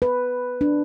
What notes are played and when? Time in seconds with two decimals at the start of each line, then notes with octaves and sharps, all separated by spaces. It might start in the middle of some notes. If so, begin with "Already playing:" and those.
0.02 B4
0.61 D4